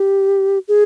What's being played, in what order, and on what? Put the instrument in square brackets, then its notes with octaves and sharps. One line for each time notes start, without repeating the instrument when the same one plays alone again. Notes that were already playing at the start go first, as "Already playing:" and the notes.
Already playing: [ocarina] G4
G#4